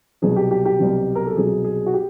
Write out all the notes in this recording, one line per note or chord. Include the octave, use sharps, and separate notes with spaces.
C2 B2 F#3 G#4
G4
G4
G4
C2 B2 F#3
A#4
A4
C2 B2 F#3 G#4
G#4
F#4
G4